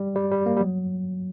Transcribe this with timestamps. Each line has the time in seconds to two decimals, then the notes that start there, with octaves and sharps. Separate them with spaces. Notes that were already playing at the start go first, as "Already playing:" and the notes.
Already playing: G3
0.15 G3
0.31 G3
0.46 A#3
0.57 G3
0.61 F#3